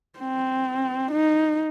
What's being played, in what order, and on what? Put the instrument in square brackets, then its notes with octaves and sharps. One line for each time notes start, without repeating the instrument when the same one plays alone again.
[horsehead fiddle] C4
D#4